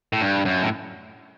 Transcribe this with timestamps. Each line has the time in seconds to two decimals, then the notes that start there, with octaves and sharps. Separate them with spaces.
0.13 A2
0.22 G2
0.45 F#2
0.63 A2